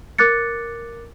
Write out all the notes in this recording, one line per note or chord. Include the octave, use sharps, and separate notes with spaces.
A#4 D6 F#6 A6 C#7